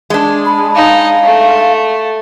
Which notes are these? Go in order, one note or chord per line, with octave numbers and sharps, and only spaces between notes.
G#3 D4
B5
D#4 F5
A3